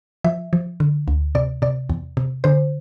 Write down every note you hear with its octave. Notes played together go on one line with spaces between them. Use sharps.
F3 E5
F3
D3
D2
C3 D5
C3 D5
E2
C3
D3 C5